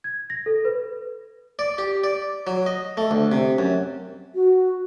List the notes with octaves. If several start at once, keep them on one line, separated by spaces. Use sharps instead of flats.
G#6
A#6
A4
B4
D5
G4
D5
F#3
D#5
A3
D2
C3
F#2
F#4